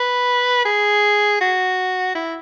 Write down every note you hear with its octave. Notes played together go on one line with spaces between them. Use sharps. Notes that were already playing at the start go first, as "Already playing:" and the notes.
Already playing: B4
G#4
F#4
E4